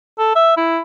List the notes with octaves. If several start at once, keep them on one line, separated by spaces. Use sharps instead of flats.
A4
E5
E4